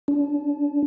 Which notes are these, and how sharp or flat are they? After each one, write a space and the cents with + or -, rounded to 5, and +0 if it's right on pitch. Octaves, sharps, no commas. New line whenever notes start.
D4 -35